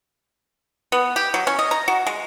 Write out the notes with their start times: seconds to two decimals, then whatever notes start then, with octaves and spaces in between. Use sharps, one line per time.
0.92 B3
1.16 G4
1.34 F#3
1.47 C#4
1.59 D#5
1.71 A#5
1.88 F#4
2.07 G#3